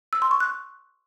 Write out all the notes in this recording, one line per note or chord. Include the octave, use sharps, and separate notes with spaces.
E6
C6
C#6
F#6